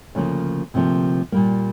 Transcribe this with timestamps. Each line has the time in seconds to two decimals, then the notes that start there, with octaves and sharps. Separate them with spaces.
0.15 D2 C#3 F3 A#3
0.74 D2 C3 F3 A#3
1.32 A#2 G3 A#3